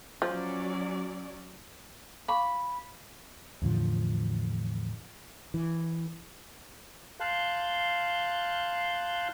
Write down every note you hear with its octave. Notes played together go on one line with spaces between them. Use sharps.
F3 F#3 C#4 D5
F5 B5 C#6 D6
E2 A2 D3 F3
E3
F5 A5 C6 F#6 G6